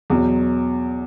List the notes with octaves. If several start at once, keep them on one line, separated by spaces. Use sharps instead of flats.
E2 B2 F#3